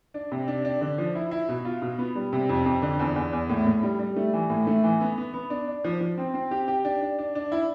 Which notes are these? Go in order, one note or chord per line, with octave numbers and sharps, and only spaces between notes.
D4
C3
D4
D4
D3
F3
E4
E4
B2
F4
B2
B3
G3
C3
F2
F2
D3
E2
E2
E2
A2
A2
G3
G3
A3
E3
A2
A3
E3
B3
B3
B3
D4
D4
F3
F3
C4
C4
G4
G4
D4
D4
D4
D4
E4